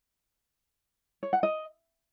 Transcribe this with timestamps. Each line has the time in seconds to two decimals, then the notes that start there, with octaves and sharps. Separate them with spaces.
1.23 C#5
1.33 F#5
1.43 D#5